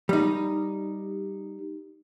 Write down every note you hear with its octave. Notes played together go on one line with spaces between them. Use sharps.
G3 D#4